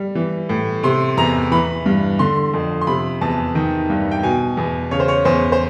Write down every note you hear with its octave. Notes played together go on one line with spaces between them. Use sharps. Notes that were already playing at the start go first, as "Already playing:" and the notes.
Already playing: G3
E3
A2
C3 C6
E2 A#5
E3 B5
G2
D3 C6
F2
C6
C3 B5
E2 A5
D#3
G2
G5
B2 G#5
E2
C#3 C#5
C5
C#5
E2 C5
C5